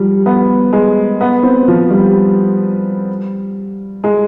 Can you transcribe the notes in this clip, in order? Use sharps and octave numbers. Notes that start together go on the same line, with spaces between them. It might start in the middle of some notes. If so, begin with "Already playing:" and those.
Already playing: F3 G3
B3
G#3
B3
C4
F3
G3
G#3